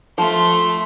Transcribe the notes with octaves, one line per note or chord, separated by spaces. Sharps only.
F3 A3 C6